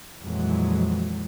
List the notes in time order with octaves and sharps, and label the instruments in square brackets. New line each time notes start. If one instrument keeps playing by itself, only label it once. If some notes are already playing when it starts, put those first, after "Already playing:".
[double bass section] F2 A#2 E3 F#3 G#3